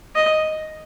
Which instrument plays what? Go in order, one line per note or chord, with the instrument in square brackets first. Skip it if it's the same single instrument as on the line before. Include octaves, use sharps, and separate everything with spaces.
[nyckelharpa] D#5